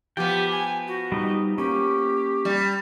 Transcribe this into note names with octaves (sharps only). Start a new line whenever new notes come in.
F3 B3 G4 G5
G#5
F#4
G3 D#4
A#3 C#4 G4
G3